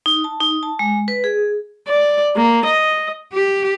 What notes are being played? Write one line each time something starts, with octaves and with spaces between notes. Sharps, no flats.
D#4
A5
D#4
A5
G#3
B4
G#4
D5
A#3
D#5
G4